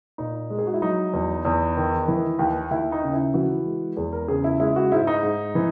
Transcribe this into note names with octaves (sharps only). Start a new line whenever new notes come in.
A#2 D#4
G#3
G#4
F#4
E4
F#3 D#4
E2
E2
D#3
E3
D#2
D#2 E4
D#4
C#3
E4
E3 F#4
G#3
E2 G#4
A#4
C#3 G#4
E4
G#3 E4
F#4
G#2 E4
D#4
G#2
E3